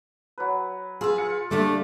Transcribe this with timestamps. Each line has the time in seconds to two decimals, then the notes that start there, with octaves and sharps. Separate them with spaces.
0.38 F#3 B4
1.01 F4 G#4 B4 E6
1.18 F4 C#7
1.51 D3 G3 A3 A#3 D4 A4 D5